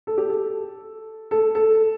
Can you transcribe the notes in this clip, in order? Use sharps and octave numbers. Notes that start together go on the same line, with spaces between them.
A4
G4
A4
A4
A4